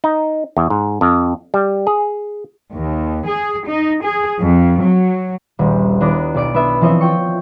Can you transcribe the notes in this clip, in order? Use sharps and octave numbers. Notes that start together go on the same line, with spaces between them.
D#4
E2
G#2
F2
G3
G#4
D#2
G#4
D#4
G#4
F2
F#3
D#1 A#1
D#2 B3 D4 E4 A#5 D6
B1 D5 D7
B3 D4 E5 B5
E3 F3 C4 C#5 D#5 E5
F4 G5 C#6